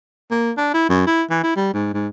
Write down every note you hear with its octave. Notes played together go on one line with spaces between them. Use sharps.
A#3
D4
E4
F#2
E4
E3
E4
G3
G#2
G#2